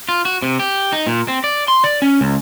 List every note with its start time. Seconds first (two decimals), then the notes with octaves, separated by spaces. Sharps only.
0.09 F4
0.25 F#4
0.42 C3
0.59 G4
0.93 D#4
1.07 A#2
1.28 C4
1.44 D5
1.68 C6
1.84 D5
2.02 C#4
2.21 C#2